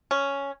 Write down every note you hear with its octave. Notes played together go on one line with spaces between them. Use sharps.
C#4